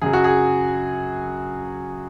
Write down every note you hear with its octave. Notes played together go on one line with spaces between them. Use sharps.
F#2 C#3 F#3 G#4
F#4
G#4